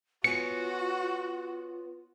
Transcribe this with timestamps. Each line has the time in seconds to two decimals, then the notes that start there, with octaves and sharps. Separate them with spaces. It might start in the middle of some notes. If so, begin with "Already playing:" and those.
0.24 B3 F4 F#4 C#5 G#5 C#7